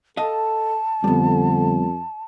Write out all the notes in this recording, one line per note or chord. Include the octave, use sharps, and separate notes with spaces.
A4 D#5 F5 A5
F2 D3 G3 B3